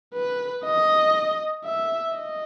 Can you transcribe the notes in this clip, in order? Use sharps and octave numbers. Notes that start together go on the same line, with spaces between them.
B4
D#5
E5
D#5